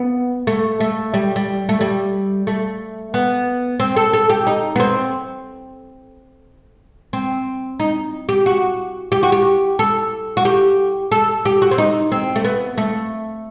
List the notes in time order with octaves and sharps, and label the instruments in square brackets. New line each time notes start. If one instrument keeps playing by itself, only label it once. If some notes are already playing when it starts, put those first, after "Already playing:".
Already playing: [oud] B3
A3
A3
G3
G3
A3
G3
A3
B3
C4
A4
A4
G4
D#4
B3
C4
C4
D#4
G4
F#4
G4
F#4
G4
A4
F#4
G4
A4
G4
F#4
C4
D#4
C4
A3
B3
A3